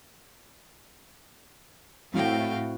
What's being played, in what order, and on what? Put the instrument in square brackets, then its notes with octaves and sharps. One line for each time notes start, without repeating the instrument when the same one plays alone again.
[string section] A2 [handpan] C4 E4 F#4 [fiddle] F5 G5